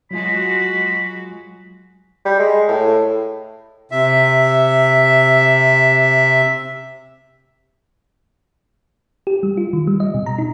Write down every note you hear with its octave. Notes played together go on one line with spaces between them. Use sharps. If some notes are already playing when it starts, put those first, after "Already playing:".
F#3 G#3 F4 F#4 G#5 B5
G3
G#3
A2
C3 E5
G4
G3
F4
D#3
G3
D#5
B2
A#5
D#4